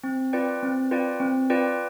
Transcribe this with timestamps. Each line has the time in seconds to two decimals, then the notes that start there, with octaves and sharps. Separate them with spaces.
0.04 C4
0.33 F4 B4 D5 G5
0.63 C4
0.91 F4 B4 D5 G5
1.20 C4
1.50 F4 B4 D5 G5